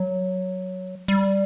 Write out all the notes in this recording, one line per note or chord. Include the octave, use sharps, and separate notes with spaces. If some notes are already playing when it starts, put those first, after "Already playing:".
Already playing: F#3
G3